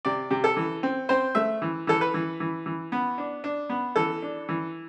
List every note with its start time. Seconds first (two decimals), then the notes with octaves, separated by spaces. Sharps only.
0.05 C3 D5
0.31 C3
0.44 A4
0.57 E3
0.83 C4
1.09 C4 C5
1.35 A3 E5
1.62 E3
1.87 E3 A4
2.01 B4
2.14 E3
2.40 E3
2.66 E3
2.92 B3
3.18 D4
3.44 D4
3.69 B3
3.96 E3 A4
4.22 D4
4.49 E3